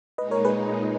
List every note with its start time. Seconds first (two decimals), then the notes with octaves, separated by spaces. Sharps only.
0.18 A#2 G#3 D#4 B4 D#5
0.31 A#4 C#5
0.45 G#4 B4